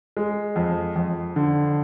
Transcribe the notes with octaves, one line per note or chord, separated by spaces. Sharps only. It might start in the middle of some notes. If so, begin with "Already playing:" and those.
G#3
F2
F2
D3